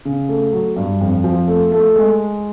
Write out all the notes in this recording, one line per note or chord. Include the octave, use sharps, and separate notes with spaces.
C#3
A3
F#3
G2
F2
F3
A3
A3
G#3